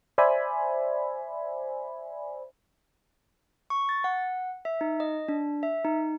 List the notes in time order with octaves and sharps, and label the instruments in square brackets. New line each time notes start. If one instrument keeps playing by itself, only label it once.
[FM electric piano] C5 D5 E5 G#5 B5
[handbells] C#6
A6
F#5
E5
D#4
D#5
D4
E5
D#4